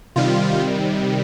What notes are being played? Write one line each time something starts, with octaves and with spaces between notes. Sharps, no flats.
C3 D#3 G3 F4